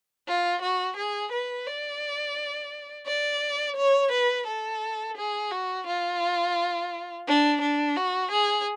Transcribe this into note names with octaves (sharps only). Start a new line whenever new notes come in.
F4
F#4
G#4
B4
D5
D5
C#5
B4
A4
G#4
F#4
F4
D4
D4
F#4
G#4